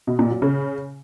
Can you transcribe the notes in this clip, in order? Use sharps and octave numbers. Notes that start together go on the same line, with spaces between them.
B2
A#2
F#3
C#3